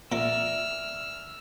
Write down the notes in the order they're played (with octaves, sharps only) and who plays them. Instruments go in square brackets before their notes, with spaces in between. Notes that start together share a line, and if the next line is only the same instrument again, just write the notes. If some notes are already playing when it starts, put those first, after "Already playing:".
[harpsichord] A#2 A#4 [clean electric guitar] D5 E5 [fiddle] E6 F6